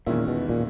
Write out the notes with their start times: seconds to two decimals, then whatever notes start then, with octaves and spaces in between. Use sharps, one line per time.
0.06 E2 A#2 D#3 G#3 C#4 E4
0.28 B2
0.49 A#2